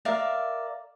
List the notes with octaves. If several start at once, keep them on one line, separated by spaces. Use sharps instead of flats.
A#4 D5 E5 F5